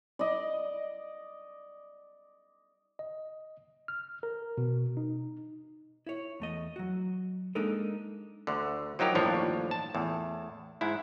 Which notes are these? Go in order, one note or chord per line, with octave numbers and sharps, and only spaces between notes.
D5 D#5
D#5
F6
A#4
B2
D#4
E4 C#5
E2 A3 D#5
F#3 F#4
G#3 A#3 D4 D#4 A4 A#4
D2 D3
F3 F#3 D#4 G4 A#4
G1 D#2 A2 F3 D4 C#5
A5
E2 A2
G#2 E4